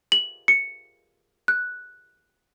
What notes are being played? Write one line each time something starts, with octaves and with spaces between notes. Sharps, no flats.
F#7
C#7
F#6